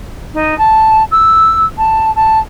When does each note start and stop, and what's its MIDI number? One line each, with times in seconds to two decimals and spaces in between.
0.34 0.57 63
0.58 1.03 81
1.11 1.65 88
1.78 2.11 81
2.16 2.39 81